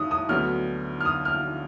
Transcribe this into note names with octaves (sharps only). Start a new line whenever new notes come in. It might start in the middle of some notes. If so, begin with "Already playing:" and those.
Already playing: G#2 D#3 D#6
D#6
D2 D3 F#3 B3 F6
F6
D#6
F6